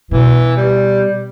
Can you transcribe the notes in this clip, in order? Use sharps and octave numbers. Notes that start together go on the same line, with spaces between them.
B2 E3
G3